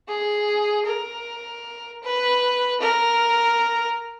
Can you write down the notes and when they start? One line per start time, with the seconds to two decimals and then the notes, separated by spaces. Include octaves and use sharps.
0.08 G#4
0.86 A#4
2.03 B4
2.81 A#4